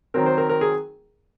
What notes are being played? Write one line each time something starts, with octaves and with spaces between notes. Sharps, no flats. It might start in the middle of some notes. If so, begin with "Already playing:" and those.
D#3 F#3 C4 A#4
C5
A#4
A#4
G#4